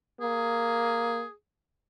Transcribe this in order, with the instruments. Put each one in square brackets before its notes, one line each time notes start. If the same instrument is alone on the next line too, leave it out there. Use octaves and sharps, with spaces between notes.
[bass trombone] A#3 [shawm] G#4